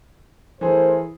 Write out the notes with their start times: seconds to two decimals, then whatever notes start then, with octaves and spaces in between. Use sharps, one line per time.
0.61 E3 A3 G#4 A#4 C5